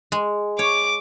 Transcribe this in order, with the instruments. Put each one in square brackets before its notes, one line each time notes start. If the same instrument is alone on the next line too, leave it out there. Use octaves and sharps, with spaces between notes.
[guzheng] G#3
[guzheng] C#5 [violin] D6